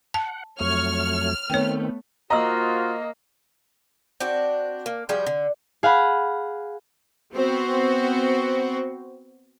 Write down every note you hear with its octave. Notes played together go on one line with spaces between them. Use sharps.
F#5 A5
F2 F#3 A3 C#5 F6
D#3 A3 B3 C4 C#5 G5
A#3 F4 F#4 C5 D#5 A#5 C6 E6
C4 D4 F#4
A#3
F3 G3 F#4 G#4
D3
G#4 F5 F#5 B5
B3 C4 F#4 C5